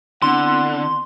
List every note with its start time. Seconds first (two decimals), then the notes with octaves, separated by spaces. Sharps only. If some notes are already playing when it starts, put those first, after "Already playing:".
0.22 D3 B3 C4 E4 F#5 C6